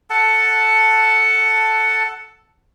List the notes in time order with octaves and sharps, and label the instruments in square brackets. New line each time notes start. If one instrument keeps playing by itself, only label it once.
[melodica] A4 F#5 A5